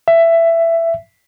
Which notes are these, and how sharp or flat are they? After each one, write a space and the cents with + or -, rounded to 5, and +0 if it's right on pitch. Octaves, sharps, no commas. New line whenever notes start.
E5 +15